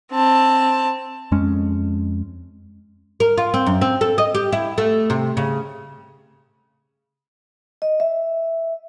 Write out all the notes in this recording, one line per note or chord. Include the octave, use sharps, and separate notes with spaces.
C4 A5
F2 G#3 C#4
A#4
F4
C4
F#2
C4
A4
D#5
G4
E4
A3
C3
C#3
D#5
E5